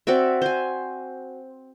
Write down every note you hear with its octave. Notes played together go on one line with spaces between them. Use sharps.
C4 F#4 D5 E5
C5 G#5